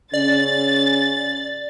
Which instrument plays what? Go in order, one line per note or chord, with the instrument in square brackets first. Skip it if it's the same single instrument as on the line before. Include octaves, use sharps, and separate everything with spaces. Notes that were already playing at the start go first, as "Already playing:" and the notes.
[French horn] C#3 [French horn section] C#4 [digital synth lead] D5 [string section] A6